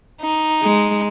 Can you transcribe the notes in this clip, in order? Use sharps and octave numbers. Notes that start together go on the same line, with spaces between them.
D#4
G#3